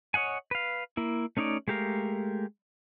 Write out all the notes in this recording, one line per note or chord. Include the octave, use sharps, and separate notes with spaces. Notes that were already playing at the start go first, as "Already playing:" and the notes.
C#5 D#5 F#5 G#5
B4 F5
A#3 E4
A3 C#4 D#4 C#5 D5
G#3 A3 G4 A#4 F5